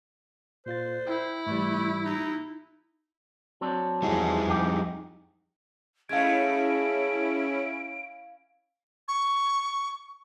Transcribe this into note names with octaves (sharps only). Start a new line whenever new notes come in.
A#2 F4 C5 A6
E4 G5
G#2 E3 G3 A3
D#4
F#3 C4 D4
E2 F3 G3 G#3 D#4 E4 G#4
F2 G4
G#3 A3 C#4 E4 F5 G#6 D7
C#6